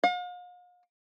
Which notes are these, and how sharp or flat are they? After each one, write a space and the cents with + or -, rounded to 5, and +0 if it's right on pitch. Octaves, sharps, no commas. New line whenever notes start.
F5 +45